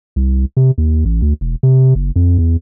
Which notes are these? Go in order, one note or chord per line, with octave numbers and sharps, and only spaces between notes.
C2
C3
D#2
A1
D2
E1
C3
F#1
F2
E2